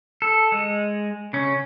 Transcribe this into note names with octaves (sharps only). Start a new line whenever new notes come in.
A4
G#3
C#3 C#4